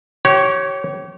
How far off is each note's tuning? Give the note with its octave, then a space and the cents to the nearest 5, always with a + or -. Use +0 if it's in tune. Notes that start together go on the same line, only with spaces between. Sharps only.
G4 -35 C#5 -5